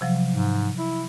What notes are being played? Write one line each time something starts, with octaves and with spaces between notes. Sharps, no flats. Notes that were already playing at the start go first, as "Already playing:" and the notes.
C3 F3 F#3
G#2
E4